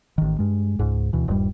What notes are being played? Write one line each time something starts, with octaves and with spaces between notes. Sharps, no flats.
A1 D#3
G2 G#3
C#2 G#2
D2 B2 E3
D#1 G2 G3